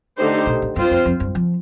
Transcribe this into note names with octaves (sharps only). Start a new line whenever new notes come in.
D3 A3 D#4 G4 C5
A#2
A2
G2 C4 F4 C5
F2
F2
G2
F3